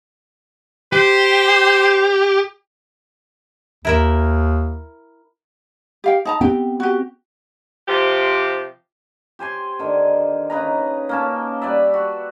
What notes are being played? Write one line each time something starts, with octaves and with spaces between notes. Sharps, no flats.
G4 C5
D#2 E4 A#4 E5
G4 F5 G5
D#4 A5 A#5
B3 C4 G4 G5
F#4 G4
C3 F3 G4
G4 C5 G#5 C6
D3 D#3
C#3 D#4 B4 A#5
A#3 C#4 A5
G3 B4 D5 E5
F#4